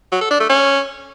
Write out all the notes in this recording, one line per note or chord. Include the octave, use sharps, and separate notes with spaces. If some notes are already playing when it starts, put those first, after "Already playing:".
F#3
A4
D4
A3
C#4